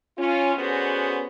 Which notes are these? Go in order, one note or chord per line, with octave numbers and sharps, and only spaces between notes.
C#4 F4
D3 B3 C#4 F#4 G#4 C5